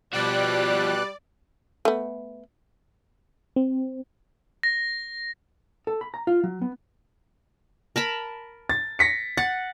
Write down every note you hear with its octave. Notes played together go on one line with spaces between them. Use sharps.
B2 F3 G3 F#4 D5 F#6
A3 B3
C4
A#6
A4
B5
A#5
F4
F#3
B3
A#4 A5 B5
A6
A#6 B6 C#7
F#5 A6